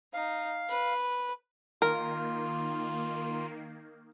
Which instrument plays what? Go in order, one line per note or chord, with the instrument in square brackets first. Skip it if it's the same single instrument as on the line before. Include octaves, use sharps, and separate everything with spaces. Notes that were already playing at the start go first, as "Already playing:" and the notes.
[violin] D#4 [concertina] F5
[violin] B4
[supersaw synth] D#3 A#3 [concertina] F4 [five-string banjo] A#4